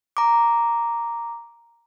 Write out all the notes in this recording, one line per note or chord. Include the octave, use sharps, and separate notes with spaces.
A#5 D6